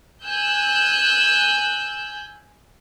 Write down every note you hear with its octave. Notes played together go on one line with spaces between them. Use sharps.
G#5 E6 F#6 G6